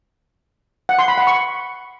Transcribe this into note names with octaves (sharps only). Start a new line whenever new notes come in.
F#5
C6
B5
F#5
C#6